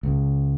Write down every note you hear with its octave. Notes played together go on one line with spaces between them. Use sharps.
C#2